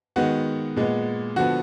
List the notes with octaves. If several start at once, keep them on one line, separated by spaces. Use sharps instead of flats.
D#3 G#3 B3 F#4
A#2 G#3 B3
D3 F3 B3 F#4